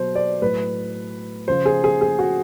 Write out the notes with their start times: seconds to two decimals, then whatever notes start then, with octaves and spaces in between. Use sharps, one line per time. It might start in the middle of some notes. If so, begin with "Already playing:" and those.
Already playing: B2 F#3 C5
0.15 D5
0.42 A2 F#3 B4
1.48 C#3 F3 C5
1.65 G#4
1.84 G#4
2.01 G#4
2.19 F#4